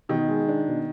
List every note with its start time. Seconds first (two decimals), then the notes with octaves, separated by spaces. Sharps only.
0.09 B2 D#3
0.28 G#3
0.48 D4
0.68 B2